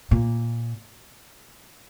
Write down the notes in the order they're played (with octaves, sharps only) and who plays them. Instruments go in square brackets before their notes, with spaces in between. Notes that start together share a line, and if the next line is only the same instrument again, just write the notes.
[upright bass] A#2